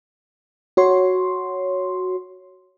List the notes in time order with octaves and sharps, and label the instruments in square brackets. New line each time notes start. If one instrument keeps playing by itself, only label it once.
[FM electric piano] F#4 C#5 C6